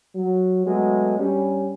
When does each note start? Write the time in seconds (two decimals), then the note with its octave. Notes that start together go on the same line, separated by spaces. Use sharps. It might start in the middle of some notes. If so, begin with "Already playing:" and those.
0.15 F#3
0.66 F#3 G#3 A3 B3
1.19 G2 G3 C#4